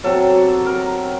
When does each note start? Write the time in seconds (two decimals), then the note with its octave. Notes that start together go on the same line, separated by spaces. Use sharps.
0.04 C3 F#3 A4
0.66 A#4